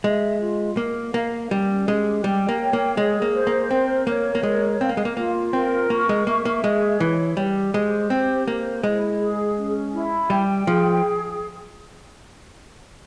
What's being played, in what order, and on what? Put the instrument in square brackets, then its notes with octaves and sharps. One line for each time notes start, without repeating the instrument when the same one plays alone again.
[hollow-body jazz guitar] G#3 [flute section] E5
[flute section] F4
[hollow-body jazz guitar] A#3 [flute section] A#4
[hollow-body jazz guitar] A#3 [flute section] F5
[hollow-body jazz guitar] G3 [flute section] C#4
[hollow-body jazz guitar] G#3 [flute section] G4
[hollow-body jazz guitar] G3 [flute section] G5
[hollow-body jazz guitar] A#3
[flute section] C#5
[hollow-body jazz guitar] A#3
[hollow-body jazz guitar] G#3 [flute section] G#4
[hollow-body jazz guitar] A#3
[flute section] C5
[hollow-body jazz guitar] A#3
[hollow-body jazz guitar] C4 [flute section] A#4
[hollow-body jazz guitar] A#3 [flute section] C#5
[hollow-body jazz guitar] A#3
[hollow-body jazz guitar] G#3 [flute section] A#4
[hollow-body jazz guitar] C4 [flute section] F5
[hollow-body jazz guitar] A#3
G#3
A#3
[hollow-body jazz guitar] A#3 [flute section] F4
[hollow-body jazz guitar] C4 [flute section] A#4
[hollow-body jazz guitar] A#3 [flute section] C#6
[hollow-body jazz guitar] G#3
[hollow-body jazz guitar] A#3 [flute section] E5
[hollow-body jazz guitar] A#3
[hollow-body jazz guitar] G#3 [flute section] G#4
[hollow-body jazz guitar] E3 [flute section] C#5
[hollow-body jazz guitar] G3 [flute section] G4
[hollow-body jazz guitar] G#3 [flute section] C5
[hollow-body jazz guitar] C4 [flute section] G4
[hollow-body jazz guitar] A#3 [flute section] C5
[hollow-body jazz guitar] G#3 [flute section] E4
[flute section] G#4
C#4
E4
[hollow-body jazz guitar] G3 [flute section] G5
[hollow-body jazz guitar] F3 [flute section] G#4